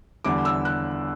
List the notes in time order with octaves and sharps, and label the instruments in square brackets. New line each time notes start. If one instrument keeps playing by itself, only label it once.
[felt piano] E2 D3 G3 D6
E6
F#6